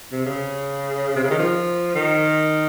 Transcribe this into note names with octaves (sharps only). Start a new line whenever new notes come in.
C3
C#3
C3
C#3
D#3
F3
D#3